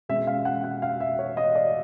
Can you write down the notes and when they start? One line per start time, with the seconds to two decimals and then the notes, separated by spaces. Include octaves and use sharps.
0.09 B2 G#3 C#4 E5
0.27 F5
0.45 F#5
0.64 F#5
0.82 F5
1.00 E5
1.19 C#5
1.37 D#5
1.55 D5